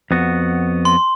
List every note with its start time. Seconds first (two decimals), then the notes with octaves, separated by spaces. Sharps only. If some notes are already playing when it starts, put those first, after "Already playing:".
0.11 F2 B3 F#4
0.85 C6